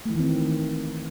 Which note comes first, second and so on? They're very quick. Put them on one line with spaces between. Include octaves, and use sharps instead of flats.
A3 E3 D#3 C4